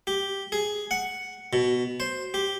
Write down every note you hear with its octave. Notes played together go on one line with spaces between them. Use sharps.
G4
G#4
F#5
B2
C5
G4